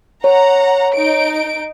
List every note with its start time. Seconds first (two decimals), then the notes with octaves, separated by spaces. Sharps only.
0.24 C#5 F#5 A#5
0.94 D#4 D7